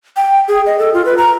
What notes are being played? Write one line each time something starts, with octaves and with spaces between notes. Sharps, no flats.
G5
G#4
D#5
A4
F4
B4
A#5